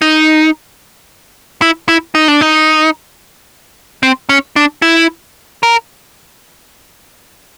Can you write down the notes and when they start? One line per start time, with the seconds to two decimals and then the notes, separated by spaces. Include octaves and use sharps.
0.02 D#4
1.62 E4
1.89 E4
2.15 D#4
2.28 D4
2.41 D#4
4.03 C4
4.29 C#4
4.56 D4
4.82 E4
5.63 A#4